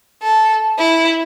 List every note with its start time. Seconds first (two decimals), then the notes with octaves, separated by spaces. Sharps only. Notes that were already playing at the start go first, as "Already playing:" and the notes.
0.22 A4
0.78 E4